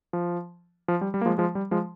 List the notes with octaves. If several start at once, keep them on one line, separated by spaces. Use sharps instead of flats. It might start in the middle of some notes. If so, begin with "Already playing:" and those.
F3
F3
G3
G3
A#3
F3 G#3
F3 G#3
G3
F3 G#3